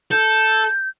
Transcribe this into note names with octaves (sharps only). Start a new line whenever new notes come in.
A4 G6